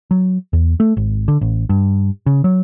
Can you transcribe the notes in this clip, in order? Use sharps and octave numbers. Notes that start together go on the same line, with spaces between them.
F#3
E2
A3
G#1
D3
A1
G2
C#3
F#3